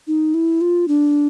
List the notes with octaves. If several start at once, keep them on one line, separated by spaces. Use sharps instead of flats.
D#4
E4
F4
D4